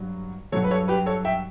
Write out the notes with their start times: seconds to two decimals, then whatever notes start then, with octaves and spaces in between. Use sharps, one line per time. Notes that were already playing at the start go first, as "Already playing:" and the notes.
Already playing: G2 F#3
0.52 G2 F#3 A4 C#5
0.64 B4
0.71 A4 C#5
0.88 G4 B4
1.06 A4 C#5
1.25 E5 G5